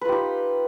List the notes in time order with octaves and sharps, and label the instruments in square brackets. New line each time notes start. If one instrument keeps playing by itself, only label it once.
[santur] B4
F4
G4
D#4